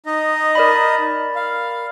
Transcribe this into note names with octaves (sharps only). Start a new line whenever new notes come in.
D#4 D#5
A#4 D5 B5
F5